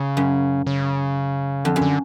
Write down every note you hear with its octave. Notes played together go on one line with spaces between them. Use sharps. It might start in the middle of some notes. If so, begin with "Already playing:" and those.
Already playing: C#3
F#2
C#3
F2 D3
F#2
D3